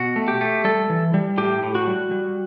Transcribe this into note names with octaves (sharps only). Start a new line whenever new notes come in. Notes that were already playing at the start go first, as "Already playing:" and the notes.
Already playing: B2 F#4
A3
G4
A3
G3 A4
E3
G3
A2 G4
A2
F#4
G3
G3